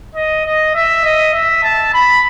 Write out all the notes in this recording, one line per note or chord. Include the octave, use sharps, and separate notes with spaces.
D#5
D#5
E5
D#5
E5
A5
B5